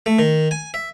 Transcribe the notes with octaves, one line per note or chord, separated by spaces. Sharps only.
A3
D#3
G#5
E5